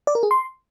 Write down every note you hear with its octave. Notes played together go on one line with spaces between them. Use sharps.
D5
A#4
G#4
C6